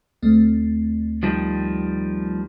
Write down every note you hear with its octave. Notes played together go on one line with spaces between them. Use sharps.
D2 A3 C4
D#3 F3 G3